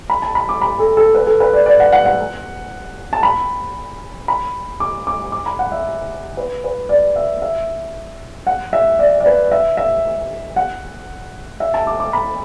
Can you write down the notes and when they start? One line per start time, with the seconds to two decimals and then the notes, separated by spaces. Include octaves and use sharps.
0.10 B5
0.22 A5
0.35 B5
0.49 D6
0.62 B5
0.79 A4
0.97 A4
1.15 B4
1.27 A4
1.40 B4
1.53 D5
1.66 D5
1.80 F#5
1.93 F#5
2.05 F#5
3.13 A5
3.23 B5
4.28 B5
4.80 D6
5.07 D6
5.32 D6
5.46 B5
5.59 F#5
5.72 E5
6.37 B4
6.64 B4
6.89 D5
7.16 E5
7.42 E5
8.47 F#5
8.73 E5
8.99 D5
9.20 D5
9.26 B4
9.52 E5
9.77 E5
10.56 F#5
11.60 E5
11.74 A5
11.87 D6
12.00 D6
12.13 B5